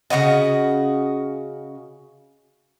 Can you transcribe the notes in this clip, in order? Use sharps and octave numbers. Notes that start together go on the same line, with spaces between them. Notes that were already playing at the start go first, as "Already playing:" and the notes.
C#3 F#3 F#4 D#5